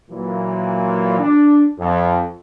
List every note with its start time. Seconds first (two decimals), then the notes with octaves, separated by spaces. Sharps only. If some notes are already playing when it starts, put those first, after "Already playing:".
0.11 A#2 E3 F#3
1.19 D4
1.79 F2